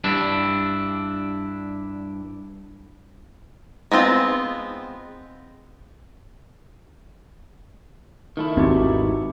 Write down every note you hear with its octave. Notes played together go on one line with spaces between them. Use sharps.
G2 D4 E4
G#3 B3 C4 F4
D#3 A3 E4
G#1 E2 C4 D#4 F#4 G4